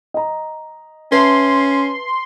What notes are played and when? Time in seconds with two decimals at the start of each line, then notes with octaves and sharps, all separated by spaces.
0.14 D#5 A#5
1.12 C#4 B4 E5 A5 C6